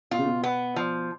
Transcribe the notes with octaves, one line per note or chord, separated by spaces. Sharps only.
B2 F4
C#3
B2
B3
F3